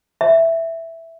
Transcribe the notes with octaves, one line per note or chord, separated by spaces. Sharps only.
E5